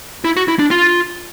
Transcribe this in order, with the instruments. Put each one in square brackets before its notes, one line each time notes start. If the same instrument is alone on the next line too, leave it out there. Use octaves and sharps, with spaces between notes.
[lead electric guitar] E4
F#4
E4
D4
F4